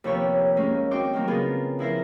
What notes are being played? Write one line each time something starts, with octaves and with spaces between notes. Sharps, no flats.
D#2 C3 F3 B3 C#5 G5
D#3 G3 G#3 A#3 C#4
C4 D#4 F#4 G5 C6 D6
D#3 F#3 A#3 C4
C#3 B3 C4 F4 G#4 A#4
F3 E4 A#4 C5